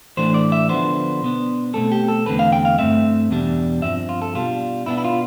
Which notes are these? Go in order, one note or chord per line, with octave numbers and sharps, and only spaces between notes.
A2 E3 A3 D4 C5
D5
E5
D3 F3 B3 D4 C5
B2 B3 D4
B2 A3 C4 A4
G4
A4
E2 D3 A3 C4 B4
F5
G5
F5
G2 F3 A3 C4 E5
E2 B2 G3 D4
G2 F3 C4 E5
F4
A4
B2 G3 D4 F4
B2 B3 D4 E4
E4
F4